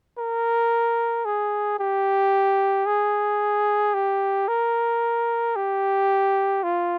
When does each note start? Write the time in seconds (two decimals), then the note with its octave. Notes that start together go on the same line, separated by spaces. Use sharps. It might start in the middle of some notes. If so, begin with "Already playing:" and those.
0.18 A#4
1.25 G#4
1.79 G4
2.86 G#4
3.94 G4
4.48 A#4
5.56 G4
6.63 F4